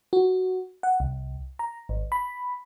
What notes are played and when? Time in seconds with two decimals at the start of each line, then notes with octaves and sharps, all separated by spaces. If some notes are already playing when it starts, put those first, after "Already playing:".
0.13 F#4
0.83 F#5
1.00 C2
1.59 A#5
1.89 G#1
2.12 B5